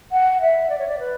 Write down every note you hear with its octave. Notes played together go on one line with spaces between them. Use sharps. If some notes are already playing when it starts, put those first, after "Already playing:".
F#5
E5
D5
C#5
D5
B4